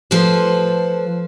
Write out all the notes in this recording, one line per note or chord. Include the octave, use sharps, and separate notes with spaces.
F3 A3 A4 B4 C5